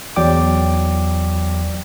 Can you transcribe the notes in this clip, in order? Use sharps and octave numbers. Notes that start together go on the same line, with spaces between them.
E2 F#3 D5 G5 D6